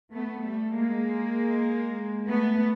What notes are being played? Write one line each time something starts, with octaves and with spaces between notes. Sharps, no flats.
A3 B3
G3 A3
G#3 A#3
A3 B3